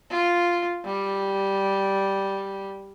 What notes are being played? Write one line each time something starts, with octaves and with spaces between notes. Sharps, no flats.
F4
G3